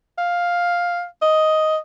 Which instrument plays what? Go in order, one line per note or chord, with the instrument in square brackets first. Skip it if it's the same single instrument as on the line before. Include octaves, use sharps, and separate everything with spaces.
[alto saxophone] F5
D#5